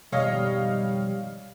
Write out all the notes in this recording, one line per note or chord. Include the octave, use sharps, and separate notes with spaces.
F2 G#2 B2 D#3 G3 C#5 D#5 F5